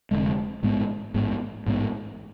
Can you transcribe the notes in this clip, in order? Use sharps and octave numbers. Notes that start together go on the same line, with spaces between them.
F1 F2 D3 G#3
A1 G#2 G#3 B3
A1 G#2 G#3 B3
A1 G#2 G#3 B3